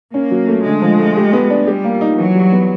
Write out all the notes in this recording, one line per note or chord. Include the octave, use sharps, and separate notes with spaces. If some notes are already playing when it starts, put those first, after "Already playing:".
A#3 C#4
F#3
A3
D3 G#3
F3
A3
G4
B3
D4
G3 G4
A#3
D#4
E3 F#3
G3
B3